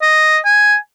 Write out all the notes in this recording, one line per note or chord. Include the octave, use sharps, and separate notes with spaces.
D#5
G#5